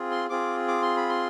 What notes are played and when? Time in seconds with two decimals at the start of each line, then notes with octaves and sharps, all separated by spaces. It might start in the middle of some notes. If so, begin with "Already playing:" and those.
Already playing: C4 F4 G#4
0.11 C6
0.30 C4 F4 G#4 D6
0.68 D6
0.82 C6
0.97 B5
1.09 C6